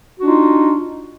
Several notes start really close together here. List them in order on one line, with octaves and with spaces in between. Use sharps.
F#4 D4 D#4 F4